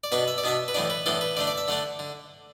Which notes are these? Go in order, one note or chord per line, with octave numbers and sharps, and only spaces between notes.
D5
B2 B3 D4 B4
E5
D5
B2 B3 D4 E5
B4
A2 E3 B3 D4 D5
B4
A2 E3 B3 D4 A4
B4
D3 A3 D4 D5
D5
E5
D3 A3 D4 F#5
D3